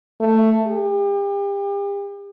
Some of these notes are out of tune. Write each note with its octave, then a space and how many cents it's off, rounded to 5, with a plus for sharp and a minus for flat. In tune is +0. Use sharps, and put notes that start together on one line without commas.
A3 +10
G4 +35